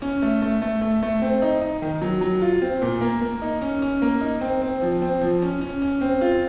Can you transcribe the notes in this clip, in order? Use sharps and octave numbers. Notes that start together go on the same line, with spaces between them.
C#4
A3
A3
A3
A3
A3
C4
D#4
D#4
D#3
F#3
F#3
F4
C4
A#2
A#3
A#3
D#4
C#4
C#4
A#3
D#4
C4
C4
F3
C4
F3
C#4
C#4
C#4
C4
F4